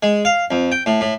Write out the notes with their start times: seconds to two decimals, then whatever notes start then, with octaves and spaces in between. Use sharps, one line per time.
0.03 G#3
0.25 F5
0.51 F2
0.72 G5
0.86 A2
1.01 A2